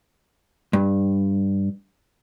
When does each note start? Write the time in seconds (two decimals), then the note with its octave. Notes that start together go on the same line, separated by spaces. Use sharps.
0.73 G2